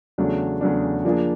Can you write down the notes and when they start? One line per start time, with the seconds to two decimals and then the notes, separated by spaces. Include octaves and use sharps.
0.18 E2 C#3 F#3 A3 D4
0.61 E2 C#3 F#3 A3 D4
1.05 F3 A#3 D4 F4 G#4